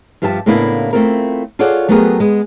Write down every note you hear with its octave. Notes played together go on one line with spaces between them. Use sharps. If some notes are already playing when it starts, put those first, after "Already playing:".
G2 F3 G4 E5 G5 A5
A2 C#3 A#3 B3 D4 E4
A3 C4 E4 F4 A#4
F4 G#4 A4 C#5 D5 F#5
F#3 A3 B3 G4 G#4 A#4
G#3 B3